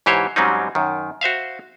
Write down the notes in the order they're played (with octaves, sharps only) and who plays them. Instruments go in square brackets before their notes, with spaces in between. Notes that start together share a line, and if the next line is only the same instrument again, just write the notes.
[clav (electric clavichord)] G#2 E3 G4 C5 C#5
G#2 F#3 G3 C4 C#4 D#4
F#2 D#3
F#4 C5 E5 F5